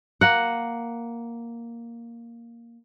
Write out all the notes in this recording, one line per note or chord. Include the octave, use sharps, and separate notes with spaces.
A#3 F#5